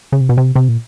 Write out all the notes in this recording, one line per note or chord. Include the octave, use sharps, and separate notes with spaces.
C#3
C3
B2
C3
C3
A#2